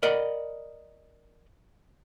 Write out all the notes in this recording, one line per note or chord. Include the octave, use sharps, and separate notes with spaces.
A#4 D5 D#5 F#5 B5